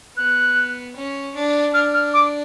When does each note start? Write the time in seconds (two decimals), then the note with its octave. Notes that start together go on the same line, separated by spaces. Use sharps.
0.16 B3 F#6
0.95 C#4
1.35 D4
1.73 D4 F6
1.94 F6
2.14 D6